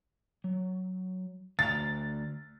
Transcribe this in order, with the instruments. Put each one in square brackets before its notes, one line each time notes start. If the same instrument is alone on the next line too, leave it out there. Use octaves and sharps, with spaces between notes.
[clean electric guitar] F#3
[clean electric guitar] D2 A#5 [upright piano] A6